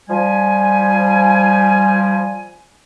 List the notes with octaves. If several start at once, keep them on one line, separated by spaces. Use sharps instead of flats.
F3 G3 G#5